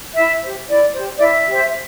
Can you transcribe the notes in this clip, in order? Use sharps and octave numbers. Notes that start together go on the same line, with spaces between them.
E4 E5
G4 C5
E4 D5
G4 C5
D5
E4 E5
G4 C5